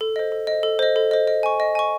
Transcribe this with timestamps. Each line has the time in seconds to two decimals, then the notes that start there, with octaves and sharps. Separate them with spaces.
0.01 A4
0.16 C5 D#5
0.32 A4
0.47 C5 D#5
0.63 A4
0.79 C5 D#5
0.96 A4
1.11 C5 D#5
1.27 D#5
1.43 G#5 C#6
1.60 D#5
1.75 G#5 C#6